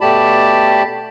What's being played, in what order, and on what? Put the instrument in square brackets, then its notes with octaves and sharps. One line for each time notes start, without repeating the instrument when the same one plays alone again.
[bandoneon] B2 A3 G4 D5 A5 B5